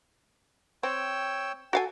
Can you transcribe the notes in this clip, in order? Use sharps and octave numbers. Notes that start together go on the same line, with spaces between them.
C4 C#5 G5 E6
F#4 A4 F5 G#5